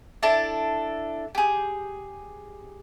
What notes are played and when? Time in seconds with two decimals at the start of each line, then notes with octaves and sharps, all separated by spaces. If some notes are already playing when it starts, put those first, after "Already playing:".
0.23 D4 E4 A4 A5
1.35 G4 G#4